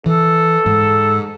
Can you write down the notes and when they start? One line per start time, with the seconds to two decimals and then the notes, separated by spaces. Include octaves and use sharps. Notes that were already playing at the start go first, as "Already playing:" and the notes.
0.06 E3 A4
0.66 G#2